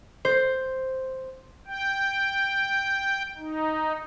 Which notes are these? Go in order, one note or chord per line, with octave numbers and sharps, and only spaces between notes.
C5
G5
D#4